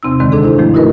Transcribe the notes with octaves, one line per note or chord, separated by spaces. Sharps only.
E2 C3 C4 D#4 E6
D2 G2 D3 D#3 G#3 C4
D4 G#4 A4
D4 E4 C5
G#2 D#3 F3 A3
D#4 E4 F#4 A#4 B4 D#5